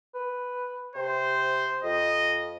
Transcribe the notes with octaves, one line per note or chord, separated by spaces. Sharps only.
B4
C3 C5
F2 D#5